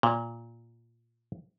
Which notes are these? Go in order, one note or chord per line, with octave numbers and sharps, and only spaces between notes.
A#2